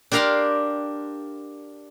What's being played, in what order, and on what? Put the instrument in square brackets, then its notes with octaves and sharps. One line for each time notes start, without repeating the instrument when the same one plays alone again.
[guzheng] D4 G4 A#4 F5 A#5 C6